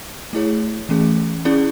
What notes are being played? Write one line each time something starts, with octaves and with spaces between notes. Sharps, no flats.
A3 E4 G#4 C#5
E3 A3 C#4 G#4
C#4 E4 G#4 D5